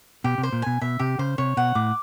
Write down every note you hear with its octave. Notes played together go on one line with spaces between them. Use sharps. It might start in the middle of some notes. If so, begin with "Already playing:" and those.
B2 G4
C3
C5
A#2
B2 G#5
B2 E5
C3 G4
C#3 C5
C3 C#5
B2 F#5
A2 D6